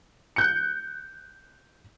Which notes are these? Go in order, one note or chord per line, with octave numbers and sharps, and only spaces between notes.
F#6 G6 C#7